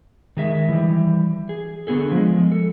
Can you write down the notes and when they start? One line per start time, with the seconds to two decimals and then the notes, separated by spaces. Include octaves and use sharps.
0.37 D#3 G#3 E5
0.69 E3 G3
1.49 G#4
1.87 D3 B3 G#4 A4
2.11 F3 G#3
2.52 A4